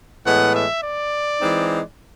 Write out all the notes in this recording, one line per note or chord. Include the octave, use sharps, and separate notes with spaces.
A2 E3 G#3 B3 F#5
E5
D5
E3 G#3 C4 D#4